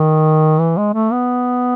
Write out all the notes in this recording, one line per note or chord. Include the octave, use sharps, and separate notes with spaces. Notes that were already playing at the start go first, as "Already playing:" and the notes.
Already playing: D#3
E3
G#3
A3
B3